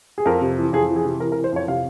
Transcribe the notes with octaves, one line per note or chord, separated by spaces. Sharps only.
G#4
F2 A#4
C3
E3
F2 G#4
E3
G#4
C3
E3 A#4
A#4
E3
C5
F2 C#5
C3 F5